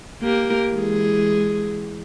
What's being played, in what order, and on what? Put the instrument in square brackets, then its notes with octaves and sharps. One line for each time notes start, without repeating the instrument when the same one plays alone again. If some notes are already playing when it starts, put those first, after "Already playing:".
[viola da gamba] A#3 G4 A#4
E3 G#3 G#4